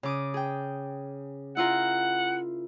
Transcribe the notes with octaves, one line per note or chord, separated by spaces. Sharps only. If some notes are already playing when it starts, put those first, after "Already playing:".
C#3 D6 D#6
G#4 G5
E4 F4 A#4 F#5